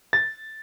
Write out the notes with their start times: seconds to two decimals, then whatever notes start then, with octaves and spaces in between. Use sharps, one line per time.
0.13 A6